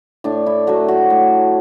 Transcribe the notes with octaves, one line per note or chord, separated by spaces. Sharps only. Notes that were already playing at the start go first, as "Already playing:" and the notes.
A2 D4
E4
F#3 A3 F#4
F#4
A2